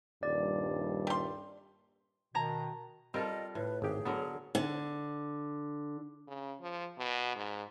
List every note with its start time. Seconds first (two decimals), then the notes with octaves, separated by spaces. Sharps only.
0.23 D#1 G2 D5
1.07 G3 C6
2.35 B2 D#3 A5 A#5 G#6
3.14 G3 C4 F4 A4 A#4 D#5
3.55 A2 B4
3.82 G#1 G4 G#4
4.05 D3 F#3 B3 A#4
4.55 D3
6.28 C#3
6.61 F3
6.98 B2
7.36 G#2